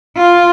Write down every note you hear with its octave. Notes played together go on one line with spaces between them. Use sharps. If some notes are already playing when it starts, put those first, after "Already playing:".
F4